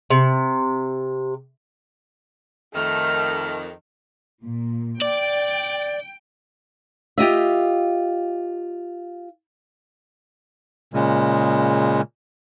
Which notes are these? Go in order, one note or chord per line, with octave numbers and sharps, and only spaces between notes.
C3
F2 D#3 A3 F6
A#2
D5 G5
F4 G4 D#5 E5
A#2 C#3 G#3